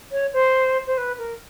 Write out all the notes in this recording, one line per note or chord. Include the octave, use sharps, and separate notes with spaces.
C#5
C5
C5
B4
A#4